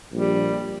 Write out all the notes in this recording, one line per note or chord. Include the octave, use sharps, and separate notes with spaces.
A#1 G3